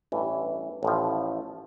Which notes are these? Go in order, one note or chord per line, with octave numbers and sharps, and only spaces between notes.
A1 G2 E3
A1 A2 F3